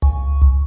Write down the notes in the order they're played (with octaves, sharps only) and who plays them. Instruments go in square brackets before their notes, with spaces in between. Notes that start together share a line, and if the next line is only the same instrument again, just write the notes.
[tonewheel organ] C#2